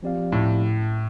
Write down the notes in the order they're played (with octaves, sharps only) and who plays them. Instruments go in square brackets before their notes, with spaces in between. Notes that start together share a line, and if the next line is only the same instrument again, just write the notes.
[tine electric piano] F3 C4 G4 D5 F5
[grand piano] A2